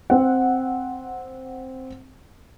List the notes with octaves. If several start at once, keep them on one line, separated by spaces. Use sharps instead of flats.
C4 F#5